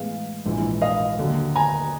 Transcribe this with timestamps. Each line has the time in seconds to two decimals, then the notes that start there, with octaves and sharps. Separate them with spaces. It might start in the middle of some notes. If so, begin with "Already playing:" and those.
Already playing: A2 E3 G#3 B3 F5
0.46 A#1 G#2 E3
0.82 D#5 F5
1.19 D#2 D3 F#3
1.56 G#5 A#5